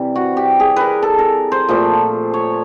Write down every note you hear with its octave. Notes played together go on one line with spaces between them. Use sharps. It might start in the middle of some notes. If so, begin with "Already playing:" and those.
Already playing: C3 E3 G3
F#4
G4
G#4
A#4 B4
A4
A#4
C5
A#2 F3 A3
C#5